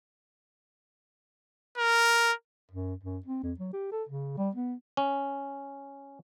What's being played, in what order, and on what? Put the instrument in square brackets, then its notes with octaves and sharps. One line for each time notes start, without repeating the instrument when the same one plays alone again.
[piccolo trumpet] A#4
[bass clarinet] F#2
F#2
C4
F2
F#3
G4
A4
C#3
G3
B3
[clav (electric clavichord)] C#4